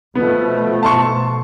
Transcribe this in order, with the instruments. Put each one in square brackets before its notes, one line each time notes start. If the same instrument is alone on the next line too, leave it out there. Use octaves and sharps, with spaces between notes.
[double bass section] B2 F3 A3 [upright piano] B3
[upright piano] A5 C6 C#6